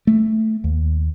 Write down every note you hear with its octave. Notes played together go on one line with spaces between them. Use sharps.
A3
D#2